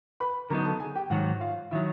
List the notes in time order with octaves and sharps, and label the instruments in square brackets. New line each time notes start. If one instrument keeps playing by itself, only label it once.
[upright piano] B4 B5
[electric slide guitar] D3 F#3 B3 D#4 [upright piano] A#4 A#5
[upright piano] A4 A5
G#4 G#5
G4 G5
[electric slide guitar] G#2 D#3 F#3 [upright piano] F#4 F#5
[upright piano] F4 F5
[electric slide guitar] D#3 F#3 [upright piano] E4 E5